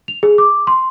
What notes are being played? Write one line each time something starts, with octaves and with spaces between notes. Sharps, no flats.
F7
G#4
D6
C6